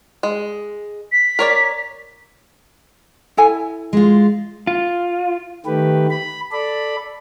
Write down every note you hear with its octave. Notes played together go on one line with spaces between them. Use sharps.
G#3
B6
A#4 C#5 D5
E4 A4 G#5
G#3 F4
F4
D#3 A3 G4 B4
B5
A4 D5 B5